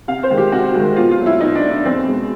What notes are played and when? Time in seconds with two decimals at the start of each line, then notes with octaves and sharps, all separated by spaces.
0.08 C3 F5
0.23 C5
0.30 D#3 G#3
0.38 G4
0.52 C3 F#4
0.74 D#3 G#3
0.96 B2 F4
1.11 F4
1.19 F#3 A3
1.26 E4
1.41 B2 D#4
1.55 D4
1.63 F#3 A3
1.70 D4
1.85 E2 C4
2.07 B2 G#3